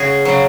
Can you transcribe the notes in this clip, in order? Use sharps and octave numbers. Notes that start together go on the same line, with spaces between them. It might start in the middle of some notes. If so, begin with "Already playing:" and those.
Already playing: C#3 F#4 G#4
C#3 F#3